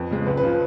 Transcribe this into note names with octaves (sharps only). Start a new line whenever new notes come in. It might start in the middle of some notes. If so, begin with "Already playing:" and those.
Already playing: F2 B4
C#3 G#3
C#2 B4
B4
C#3 F3